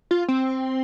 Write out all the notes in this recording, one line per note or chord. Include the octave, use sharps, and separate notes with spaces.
F4
C4